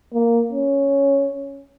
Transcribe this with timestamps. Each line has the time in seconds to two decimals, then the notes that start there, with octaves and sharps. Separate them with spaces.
0.14 A#3
0.52 C#4